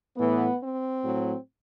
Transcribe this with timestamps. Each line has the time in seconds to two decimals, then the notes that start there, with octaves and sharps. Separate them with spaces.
0.17 A2 E3 B3
0.61 C4
1.03 A2 F#3